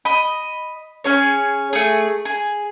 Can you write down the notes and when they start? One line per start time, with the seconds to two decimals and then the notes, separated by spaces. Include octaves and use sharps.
0.05 D#5 B5
1.04 C#4 G#4 C#5
1.73 A3 G#4
2.25 G#4